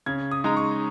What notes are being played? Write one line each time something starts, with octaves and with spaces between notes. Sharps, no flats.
C#3 G#6
D#6
G#3 D#4 A#5
C#6